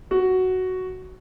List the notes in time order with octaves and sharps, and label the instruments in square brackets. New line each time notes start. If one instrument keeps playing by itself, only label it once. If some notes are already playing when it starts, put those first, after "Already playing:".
[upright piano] F#4